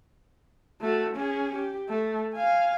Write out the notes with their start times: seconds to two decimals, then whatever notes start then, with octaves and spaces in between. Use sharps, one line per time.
0.81 A3 F#4
1.16 C#4 G#4
1.55 G4
1.89 A3
2.34 F5 G#5